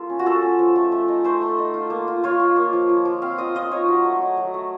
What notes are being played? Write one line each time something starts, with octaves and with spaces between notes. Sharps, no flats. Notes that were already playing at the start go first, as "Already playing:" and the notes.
Already playing: A#3 F4 A4
C#4
F#4
F4 A4
C#4
F3
A3
A3
D#4
A3 C5
A3
D#4
F4
A#3
F4
F4 C#5
F4
A#3
F3
F3
F3
C4 F5
F4 D#5
F4 D#5
D#4 C#5
F#3
A3
D#4
F#3
A3